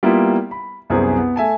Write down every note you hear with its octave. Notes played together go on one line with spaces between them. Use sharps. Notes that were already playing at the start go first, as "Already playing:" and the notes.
G3 A#3 B3 E4 F4
B5
C2 F#2 B3 G#4 C5
B3
A3 E5 G#5 A5